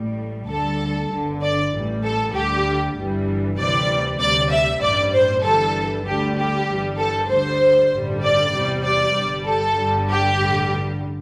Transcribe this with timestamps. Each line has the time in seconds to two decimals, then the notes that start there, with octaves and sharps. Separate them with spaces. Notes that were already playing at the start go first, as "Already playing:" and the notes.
Already playing: A1 A2 G3
0.48 D2 D3 G3 A4
1.10 G1 G2 D3
1.41 D5
1.72 A1 A2 E3 G3
2.04 A4
2.34 D2 D3 G3 G4
2.96 G1 G2 E3 G3
3.57 D2 C3 E3 G3 D5
4.19 D2 C3 G3 D5
4.51 E5
4.81 A1 G2 G3 D5
5.13 C5
5.43 G1 G2 E3 G3 A4
6.06 D2 D3 G3 G4
6.36 G4
6.68 G1 G2 E3 G3
6.97 A4
7.29 D2 D3 G3 C5
7.91 A1 G2 D3 G3
8.22 D5
8.53 E2 C3 G3
8.83 D5
9.14 G1 G2 G3
9.45 A4
9.76 G1 G2 D3 G3
10.08 G4
10.38 A1 G2 D3 G3